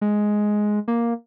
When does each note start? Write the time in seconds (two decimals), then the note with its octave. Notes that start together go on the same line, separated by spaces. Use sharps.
0.01 G#3
0.88 A#3